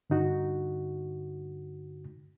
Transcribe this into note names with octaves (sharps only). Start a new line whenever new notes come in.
G2 D3 D#4 F#4